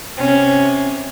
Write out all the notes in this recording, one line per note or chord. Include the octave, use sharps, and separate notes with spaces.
C3 C#4